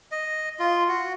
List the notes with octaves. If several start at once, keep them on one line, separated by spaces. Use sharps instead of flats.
D#5
F4
F#4